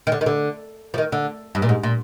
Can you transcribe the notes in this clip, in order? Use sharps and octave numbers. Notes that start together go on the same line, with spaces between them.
D#3
D3
D#3
D3
F3
D#3
D3
G2
A#2
G#2
A#2